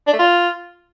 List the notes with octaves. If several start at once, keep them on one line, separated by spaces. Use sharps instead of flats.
D4
A3
F4